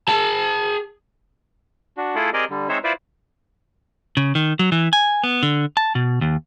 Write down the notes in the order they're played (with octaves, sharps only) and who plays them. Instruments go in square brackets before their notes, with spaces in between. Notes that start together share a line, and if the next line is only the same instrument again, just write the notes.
[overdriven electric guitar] G#4 A5
[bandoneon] D4 F#4
A3 E4 F4 G#4 A4
C4 G4 G#4 A#4 D5 D#5
D3 G3
G#3 C4 D#4 C5 C#5 E5
E4 F4 B4 C5 D5 E5
[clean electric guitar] C#3
D#3
F#3
E3
G#5
B3
D3
A5
B2
D#2